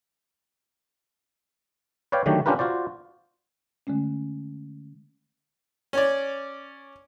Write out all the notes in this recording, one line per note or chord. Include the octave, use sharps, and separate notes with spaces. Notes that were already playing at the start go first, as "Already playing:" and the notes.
B4 C#5 D5 F5 G5
D3 D#3 F#3 A3 F#4 G4
C#4 D4 F4 G4 A#4 B4
F4 F#4 C5 D5
D3 G#3 A3 C#4
C#4 C#5 D5